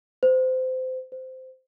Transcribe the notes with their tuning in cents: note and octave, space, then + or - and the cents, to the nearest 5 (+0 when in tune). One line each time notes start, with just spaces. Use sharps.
C5 -25
C5 -15